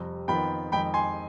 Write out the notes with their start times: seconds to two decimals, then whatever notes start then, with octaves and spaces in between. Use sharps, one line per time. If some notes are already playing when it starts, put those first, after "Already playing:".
Already playing: F2 C3 G3
0.28 F2 D#3 B3 F4 G5 B5
0.72 F2 D#3 G#3 G5 B5
0.94 G#5 C6